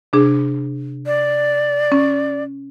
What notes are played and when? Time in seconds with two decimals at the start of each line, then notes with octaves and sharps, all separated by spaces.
0.13 C3 D4 G#4
1.06 D5
1.92 C#4